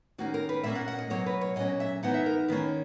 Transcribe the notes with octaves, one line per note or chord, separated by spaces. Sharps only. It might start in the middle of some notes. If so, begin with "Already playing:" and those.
D#3 A#3 C#4 F#4
A#4
B4
A#2 A#3 C#4 E5
F#5
F#5
D#5
B2 F#3 A#3 C#5
B4
C#5
A#2 F#3 C#4 D#5
E5
E3 B3 D#4 F#5
E5
A#4
D#3 A#3 C#4 B4